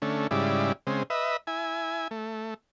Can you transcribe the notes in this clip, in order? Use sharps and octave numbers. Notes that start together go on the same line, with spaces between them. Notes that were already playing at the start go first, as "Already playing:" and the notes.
D3 A3 C#4
G#2 C#3 G3 E4 D5
C#3 G#3 C4
B4 D#5 E5
E4 G#5
A3